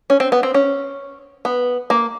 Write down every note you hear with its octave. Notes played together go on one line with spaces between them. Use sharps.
C#4
C4
B3
C4
C#4
B3
A#3